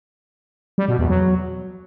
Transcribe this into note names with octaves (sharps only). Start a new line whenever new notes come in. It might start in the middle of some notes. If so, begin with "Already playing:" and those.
G3
B2
E2
F#3